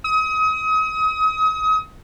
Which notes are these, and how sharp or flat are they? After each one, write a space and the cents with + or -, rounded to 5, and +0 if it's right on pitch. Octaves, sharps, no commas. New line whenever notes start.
D#6 +35